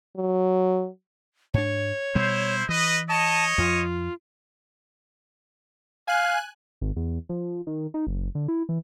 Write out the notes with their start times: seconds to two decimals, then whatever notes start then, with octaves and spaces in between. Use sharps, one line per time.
0.17 F#3
1.54 G#2 D4 C#5
2.15 B2 G3 E4 C5
2.69 E3 B4 D#5
3.09 C#5 D#5 A5
3.58 F2 F3 F4
6.08 F5 G#5 F#6
6.81 G#1
6.96 E2
7.29 F3
7.67 D#3
7.94 D#4
8.07 F#1
8.35 D3
8.48 E4
8.69 E3